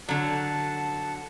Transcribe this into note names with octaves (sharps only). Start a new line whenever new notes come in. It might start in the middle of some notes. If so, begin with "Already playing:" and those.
D3 F#3 F#5 A5